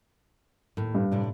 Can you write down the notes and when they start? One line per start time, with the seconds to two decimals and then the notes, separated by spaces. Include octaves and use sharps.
0.77 D#2 A2
0.95 G2
1.11 A2 C3 D4